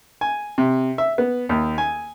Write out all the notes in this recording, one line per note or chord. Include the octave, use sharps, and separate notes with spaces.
G#5
C3
E5
B3
D#2
G#5